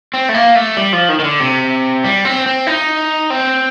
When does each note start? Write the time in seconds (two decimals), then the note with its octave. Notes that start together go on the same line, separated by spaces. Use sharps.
0.14 C4
0.29 A3
0.35 A#3
0.55 A3
0.77 G3
0.93 F3
1.09 D#3
1.19 D#3
1.24 D3
1.40 C3
2.04 G3
2.25 C4
2.46 C4
2.67 D#4
3.30 C4